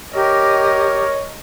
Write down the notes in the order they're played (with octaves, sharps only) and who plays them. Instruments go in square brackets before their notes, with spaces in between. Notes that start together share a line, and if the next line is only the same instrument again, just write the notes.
[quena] G4 [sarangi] A#4 [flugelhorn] C#5 [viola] D#5